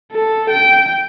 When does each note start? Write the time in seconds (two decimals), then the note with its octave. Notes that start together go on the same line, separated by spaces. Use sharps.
0.12 A4
0.50 G5